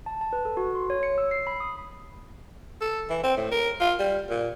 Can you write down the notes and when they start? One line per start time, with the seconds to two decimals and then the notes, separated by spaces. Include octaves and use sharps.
0.06 A5
0.21 A5
0.33 B4
0.45 A4
0.57 F#4
0.75 C6
0.90 C#5
1.03 C#7
1.18 E6
1.31 C7
1.47 B5
1.60 D#6
2.81 A4
3.10 E3
3.24 C4
3.37 A2
3.52 A#4
3.80 F4
3.99 G3
4.30 A#2